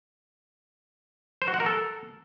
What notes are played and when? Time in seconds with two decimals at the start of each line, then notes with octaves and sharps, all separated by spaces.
1.42 C5
1.48 F#4
1.54 F#5
1.60 A#4
1.66 A4